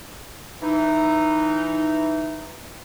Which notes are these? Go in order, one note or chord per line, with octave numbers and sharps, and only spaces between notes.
E3 D#4